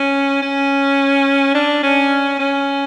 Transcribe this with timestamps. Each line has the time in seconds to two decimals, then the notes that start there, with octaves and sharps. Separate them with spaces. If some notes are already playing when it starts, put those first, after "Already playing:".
Already playing: C#4
0.42 C#4
1.55 D4
1.83 C#4
2.39 C#4